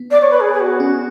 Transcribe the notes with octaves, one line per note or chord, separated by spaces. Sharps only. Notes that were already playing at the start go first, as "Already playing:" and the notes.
Already playing: B3
D5
C#5
B4
G#4
G#4
F#4
C#4